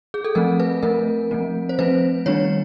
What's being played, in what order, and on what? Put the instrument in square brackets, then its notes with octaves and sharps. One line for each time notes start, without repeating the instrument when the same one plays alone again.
[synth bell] G#4
A4
F3 A3 C4 A#4
B4
F3 A3 C4 A#4
F3 A3 C4
C5
F3 A3 C4 B4
D#3 G3 B3 D4 C#5